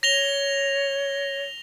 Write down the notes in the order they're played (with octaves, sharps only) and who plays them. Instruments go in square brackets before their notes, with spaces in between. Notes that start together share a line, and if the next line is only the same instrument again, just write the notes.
[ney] C#5 [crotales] A#6 F7 G7